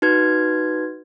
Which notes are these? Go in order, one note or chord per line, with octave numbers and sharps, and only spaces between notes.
D#4 F#4 B4 G#6